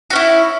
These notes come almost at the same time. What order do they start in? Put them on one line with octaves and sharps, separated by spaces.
F#4 C#4 E4